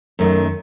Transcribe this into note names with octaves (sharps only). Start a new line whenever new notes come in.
F#2 D#3 A3